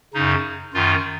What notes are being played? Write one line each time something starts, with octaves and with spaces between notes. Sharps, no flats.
F#2 C#3 D#4
F#2 D#3 F4